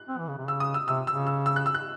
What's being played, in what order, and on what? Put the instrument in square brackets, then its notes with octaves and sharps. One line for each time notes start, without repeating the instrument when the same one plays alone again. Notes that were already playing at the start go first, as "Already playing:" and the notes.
Already playing: [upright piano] F#6
[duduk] C4
E3
C#3
C3
[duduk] C#3 [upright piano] E6
[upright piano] D#6
E6
[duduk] C3 [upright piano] E6
[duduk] C#3 [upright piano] E6
[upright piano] E6
E6
F#6
E6
F#6